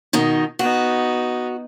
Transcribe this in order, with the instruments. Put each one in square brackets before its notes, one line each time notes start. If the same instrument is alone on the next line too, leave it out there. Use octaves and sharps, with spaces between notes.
[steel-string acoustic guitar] B2 D#3 D#4
[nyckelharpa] B3 D#4 [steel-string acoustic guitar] F#4